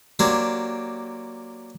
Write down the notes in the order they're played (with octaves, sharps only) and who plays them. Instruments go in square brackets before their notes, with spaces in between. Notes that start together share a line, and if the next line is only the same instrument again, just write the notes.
[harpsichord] F#3 A#3 D4 G4 C5